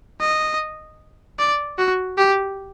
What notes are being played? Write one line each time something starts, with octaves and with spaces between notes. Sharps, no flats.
D#5
D5
F#4
G4